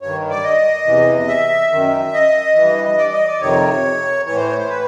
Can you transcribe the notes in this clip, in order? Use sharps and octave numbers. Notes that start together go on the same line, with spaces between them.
G2 D#3 C#5
D5
D#5
E2 C3 E3
E5
F#2 D#3
D#5
G2 E3
D5
D#5
D5
F2 C3 D#3 C#5
A2 E3 C#5
C5
C#5
C5
B4